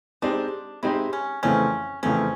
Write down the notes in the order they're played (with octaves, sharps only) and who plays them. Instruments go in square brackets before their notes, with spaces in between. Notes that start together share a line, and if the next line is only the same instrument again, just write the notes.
[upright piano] G#3 C4 D#4 G4 C5 [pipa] D4
[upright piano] G#3 C4 D#4 G4 C5 [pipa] E4
[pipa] C#4
[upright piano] F2 C#3 E3 A3 C4 [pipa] C#4
[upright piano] F2 C#3 E3 A3 C4 [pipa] C#4